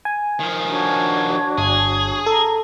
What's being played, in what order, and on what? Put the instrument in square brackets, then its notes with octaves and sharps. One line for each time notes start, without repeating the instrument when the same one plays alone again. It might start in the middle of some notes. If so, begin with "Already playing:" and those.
[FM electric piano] G#5
[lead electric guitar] D#3 F3
[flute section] D4 F#4 C#5
[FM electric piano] G1 [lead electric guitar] G#4
[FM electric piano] A4 [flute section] A#5